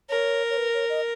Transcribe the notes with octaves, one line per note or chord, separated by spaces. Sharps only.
A#4 C#5
C#5
B4
C#5
D#5